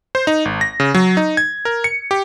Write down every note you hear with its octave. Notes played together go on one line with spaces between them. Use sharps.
C5
D#4
G#1
A#6
C#3
F#3
D#4
G#6
A#4
C#7
G4